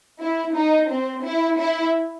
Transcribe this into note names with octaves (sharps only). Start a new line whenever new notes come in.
E4
D#4
C4
E4
E4